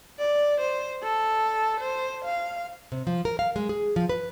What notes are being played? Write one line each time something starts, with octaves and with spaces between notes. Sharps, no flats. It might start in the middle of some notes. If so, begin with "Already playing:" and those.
D5
C5
A4
C5
F5
C3
F3
A#4
F5
G#3
G#4
F3
B4